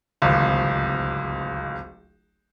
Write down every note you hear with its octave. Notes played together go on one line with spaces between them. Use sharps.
D1 G#1 C#2